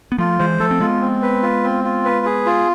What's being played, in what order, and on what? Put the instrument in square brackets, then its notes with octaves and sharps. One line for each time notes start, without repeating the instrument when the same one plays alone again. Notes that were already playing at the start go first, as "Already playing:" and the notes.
[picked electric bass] B3
[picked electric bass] F3 A3 [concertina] F4
[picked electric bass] E3 G#3 [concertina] C5
[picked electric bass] F3 A3 [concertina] A4
[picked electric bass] C4
[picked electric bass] G#3 B3 [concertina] F4
[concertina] C4
B4
F4
C4
F4
B4
G#4
F4